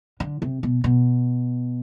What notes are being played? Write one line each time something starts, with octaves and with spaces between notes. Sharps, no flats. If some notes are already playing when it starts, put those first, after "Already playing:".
D3
C3
B2
B2